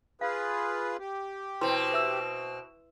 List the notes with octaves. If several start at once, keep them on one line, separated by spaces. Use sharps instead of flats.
F4 G#4 B4 F5
G4
B2 C4 E4 B4 C6
B4 E5 E6